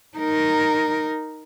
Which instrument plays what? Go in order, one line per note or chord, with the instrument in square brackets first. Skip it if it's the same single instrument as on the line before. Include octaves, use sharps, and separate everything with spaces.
[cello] D#4 A#4